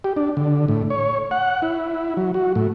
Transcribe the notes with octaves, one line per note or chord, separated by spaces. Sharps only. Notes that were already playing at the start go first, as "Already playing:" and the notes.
G4
D4
D3
A2
C#5
F#5
E4
F#3
F#4
A2